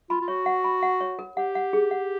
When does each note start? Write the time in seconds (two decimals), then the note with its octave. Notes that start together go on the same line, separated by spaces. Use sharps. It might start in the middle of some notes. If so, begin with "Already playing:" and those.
0.10 F4 B5
0.21 F4
0.28 F#4 C#5
0.46 F#5
0.64 B5
0.83 F#5
1.01 C#5
1.19 A#4
1.37 G4 F#5
1.55 F#5
1.73 G#4
1.91 F#5